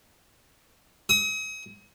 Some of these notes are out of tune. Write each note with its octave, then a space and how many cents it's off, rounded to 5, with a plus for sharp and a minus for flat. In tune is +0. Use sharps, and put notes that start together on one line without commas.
D#6 +40